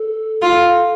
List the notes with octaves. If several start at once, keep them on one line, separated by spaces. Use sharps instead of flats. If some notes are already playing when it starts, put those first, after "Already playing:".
Already playing: A4
F4